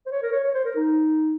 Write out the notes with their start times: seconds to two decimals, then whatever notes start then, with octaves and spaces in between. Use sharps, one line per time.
0.06 C5
0.11 C#5
0.22 A#4
0.32 C#5
0.44 C#5
0.55 C5
0.65 A#4
0.76 D#4